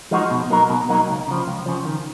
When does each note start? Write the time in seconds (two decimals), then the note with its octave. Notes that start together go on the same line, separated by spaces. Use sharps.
0.11 F3 G#3 D#4 F#4
0.31 B2
0.50 F#3 A#3 D#4 A#4
0.70 B2
0.89 F#3 A#3 D#4 A#4
1.08 C#2
1.27 C#3 F3
1.48 C#2
1.66 C#3 F3
1.85 D#3